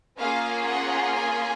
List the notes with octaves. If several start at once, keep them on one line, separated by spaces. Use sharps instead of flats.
A#3 C#4 F4 G#4 F5
F#5
G#5